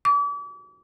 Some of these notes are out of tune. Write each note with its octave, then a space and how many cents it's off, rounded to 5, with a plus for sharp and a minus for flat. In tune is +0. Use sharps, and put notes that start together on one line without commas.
D6 -40